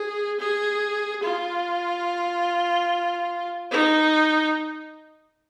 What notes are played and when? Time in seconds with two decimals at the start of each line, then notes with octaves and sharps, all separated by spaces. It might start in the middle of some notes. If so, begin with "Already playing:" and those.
Already playing: G#4
0.40 G#4
1.23 F4
3.71 D#4